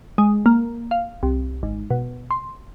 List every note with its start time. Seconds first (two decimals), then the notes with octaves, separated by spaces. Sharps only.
0.18 G#3
0.46 A#3
0.91 F5
1.23 C2
1.63 G#1
1.90 B2
2.31 C6